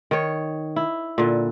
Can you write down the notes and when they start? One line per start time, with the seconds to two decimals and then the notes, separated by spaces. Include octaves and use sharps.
0.11 D#3 C#5
0.76 E4
1.18 A#2 D3